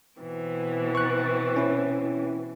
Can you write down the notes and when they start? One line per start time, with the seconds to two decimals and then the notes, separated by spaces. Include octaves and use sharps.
0.21 B2 E3 C4
0.95 C#6 F#6
1.56 C#4 E4